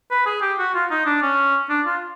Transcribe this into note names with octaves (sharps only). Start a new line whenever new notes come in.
B4
G#4
G4
F#4
F4
D#4
D4
C#4
D4
F4